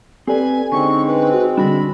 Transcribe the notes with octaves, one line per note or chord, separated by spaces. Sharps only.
C4 G4 A4 B4 D5 G#5
D3 G#3 C4 C#4 D#4 C#6
B4
F#4
D3 G3 D4 F#4 D5 B5